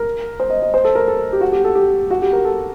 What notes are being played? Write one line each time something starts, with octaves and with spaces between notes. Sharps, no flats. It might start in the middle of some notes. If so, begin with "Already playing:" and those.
Already playing: A#4
C5
D#5
D#5
C5
A4
A#4
A4
G4
F#4
G4
A4
G4
F#4
G4
A#4
A4